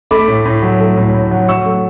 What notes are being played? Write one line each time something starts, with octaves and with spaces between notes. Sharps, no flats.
A3 B5 D6
A2
A2
F#3
A3
A2
A2
F#3
F#3 C#6 E6
A3